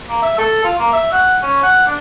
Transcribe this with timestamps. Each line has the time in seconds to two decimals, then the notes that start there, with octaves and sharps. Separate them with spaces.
0.09 A#3
0.22 E5
0.38 A4
0.64 F4
0.79 A#3
0.93 E5
1.12 F#5
1.42 C#4
1.63 F#5
1.87 D4